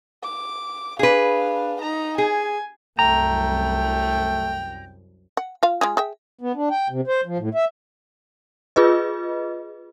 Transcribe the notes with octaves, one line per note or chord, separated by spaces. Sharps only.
D6
D4 G#4 B4 F5
D#4 A#5
G#4 G#5
C2 F#2 A3 G5 A#5
F#5
F4 F5
G#3 F4 G#4
G#4 E5 G5
B3
D4
G5
C3
C5
F3
A2
E5
F4 G#4 B4 D#5